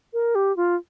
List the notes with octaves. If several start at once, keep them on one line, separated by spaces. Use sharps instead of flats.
A#4
G4
F4